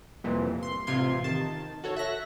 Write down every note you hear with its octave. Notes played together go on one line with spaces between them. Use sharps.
C2 F2 A#2 E3
C6
A1 C3 F4 C6 G#6
D#3 A5
F#4 A4 C#5
E5 F#6 A#6